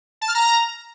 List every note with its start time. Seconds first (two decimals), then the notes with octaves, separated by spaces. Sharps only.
0.21 A5
0.28 F6
0.35 A#5